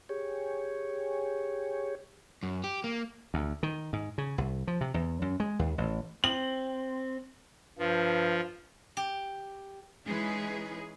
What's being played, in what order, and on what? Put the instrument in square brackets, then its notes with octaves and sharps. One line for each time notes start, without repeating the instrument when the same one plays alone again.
[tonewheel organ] G4 G#4 C#5
[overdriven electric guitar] F#2
G4
A#3
[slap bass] D2
D#3
G#2
C#3
C2
F3
C3
E2
F#2
G#3
D#2
A1
[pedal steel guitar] C4 [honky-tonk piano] F#7
[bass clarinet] G2 [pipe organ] F3
[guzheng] G4
[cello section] E3 G#3 C#4 D#4 G#4 B4